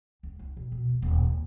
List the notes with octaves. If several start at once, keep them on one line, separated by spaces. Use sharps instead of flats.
C#2
D#4
B2
B2
F2
D#1
D#2